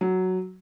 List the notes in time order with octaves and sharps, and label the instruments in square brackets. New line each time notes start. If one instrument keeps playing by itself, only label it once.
[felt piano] F#3